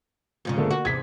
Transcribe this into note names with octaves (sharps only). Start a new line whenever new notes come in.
F2 G#2 C#3
D3 A3 A#3
A#3 F#4
E2 G#2 C3 G#6 B6